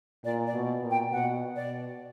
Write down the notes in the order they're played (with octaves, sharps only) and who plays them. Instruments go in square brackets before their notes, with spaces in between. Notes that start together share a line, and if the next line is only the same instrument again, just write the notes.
[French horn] A#2 [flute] D5
[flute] D5
[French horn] B2
A#2
[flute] G5
[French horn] B2 [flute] F#5
[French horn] B2 [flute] D5